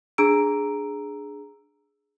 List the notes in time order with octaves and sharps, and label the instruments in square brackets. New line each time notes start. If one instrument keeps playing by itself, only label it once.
[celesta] D4 G#4 A#5 E6 D7